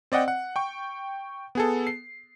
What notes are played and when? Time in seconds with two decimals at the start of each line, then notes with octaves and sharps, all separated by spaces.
0.12 C4 D5 D#5 F#5 G5
0.28 F#5
0.56 G5 C#6
1.55 B3 G#4 A4
1.87 C7